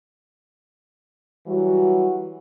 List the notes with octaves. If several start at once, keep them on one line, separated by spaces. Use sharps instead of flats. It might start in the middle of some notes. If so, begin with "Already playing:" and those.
E3 F#3 G3 F#4